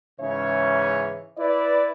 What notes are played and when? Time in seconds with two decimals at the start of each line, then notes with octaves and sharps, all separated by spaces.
0.21 G#2 C#3 E3 C#4 C#5 E5
1.38 E4 B4 D5